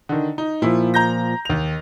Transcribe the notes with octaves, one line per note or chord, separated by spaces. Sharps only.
D3 D#3
D#4
A#2 D#3 F3 E4
A#5 G6 A#6
D#2 F7